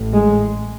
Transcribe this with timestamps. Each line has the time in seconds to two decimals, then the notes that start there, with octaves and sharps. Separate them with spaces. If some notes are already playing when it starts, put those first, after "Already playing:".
Already playing: A1 A2
0.13 G#3